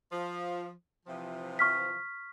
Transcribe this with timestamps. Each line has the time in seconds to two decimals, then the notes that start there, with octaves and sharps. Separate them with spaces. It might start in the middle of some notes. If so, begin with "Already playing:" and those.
0.12 F3
1.06 C3 E3 F3
1.59 C#6 F6 B6